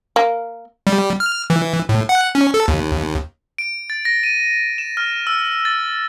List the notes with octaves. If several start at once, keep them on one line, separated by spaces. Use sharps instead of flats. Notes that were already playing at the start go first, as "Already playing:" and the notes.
A#3
G3
F6
E3
A2
F#5
C#4
A4
D#2
D7
A6
A#6
D#7
E7
F6
E6
A6